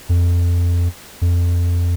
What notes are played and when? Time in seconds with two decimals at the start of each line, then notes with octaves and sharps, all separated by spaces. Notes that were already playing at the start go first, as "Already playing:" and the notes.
0.09 F2
1.22 F2